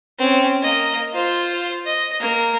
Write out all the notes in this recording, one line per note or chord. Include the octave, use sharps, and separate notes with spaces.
C4 C#4
A#3 D#5
F4 C5
D#5
A#3